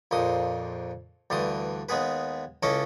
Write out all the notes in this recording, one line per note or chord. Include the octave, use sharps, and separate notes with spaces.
A#1 F2 A#2 C6 D#6
D2 G2 E3 C6 D#6
D#2 G#3 B3 G#4 B4
C#2 C#4 E4 A4 D#5 A5